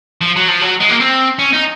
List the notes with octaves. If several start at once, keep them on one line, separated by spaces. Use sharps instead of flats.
F3
F#3
F3
F#3
G#3
A#3
C4
C#4
D#4